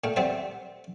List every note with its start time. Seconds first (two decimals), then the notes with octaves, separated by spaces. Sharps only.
0.04 A#2 A3 G5
0.16 G3 B3 C4 D5 E5 G5